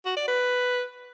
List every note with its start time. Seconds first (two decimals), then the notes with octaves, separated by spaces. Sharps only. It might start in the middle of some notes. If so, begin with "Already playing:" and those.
0.06 F#4
0.17 D5
0.28 B4